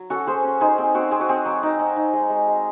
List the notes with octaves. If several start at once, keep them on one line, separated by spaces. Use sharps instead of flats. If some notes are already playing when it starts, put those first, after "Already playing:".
Already playing: F#3
C#4 F#4 A4
C#4 G#4 C5
C#4
D#4 G#4 C5
C4 G#4
C4 F#4
C4 G#4
F#4
C4 G#4
F#3
D#4
D#4
D#4
G#3
G#3
G#3